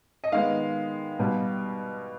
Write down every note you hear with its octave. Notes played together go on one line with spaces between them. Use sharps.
D#5
D#3 G#3 B3 F5
B2 G3 B3